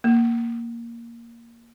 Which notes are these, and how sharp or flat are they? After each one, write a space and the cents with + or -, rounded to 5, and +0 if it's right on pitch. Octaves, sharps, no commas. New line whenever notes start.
A#3 +0